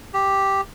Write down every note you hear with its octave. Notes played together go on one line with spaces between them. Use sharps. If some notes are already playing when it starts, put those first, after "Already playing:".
G4